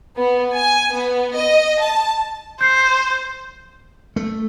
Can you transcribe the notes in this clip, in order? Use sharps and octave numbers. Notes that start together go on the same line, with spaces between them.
B3
G#5
B3
D#5
A5
C5 G6 C7
A3